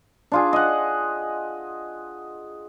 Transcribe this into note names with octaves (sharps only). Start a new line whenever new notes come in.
D4 F4 G#4
D#5 F#5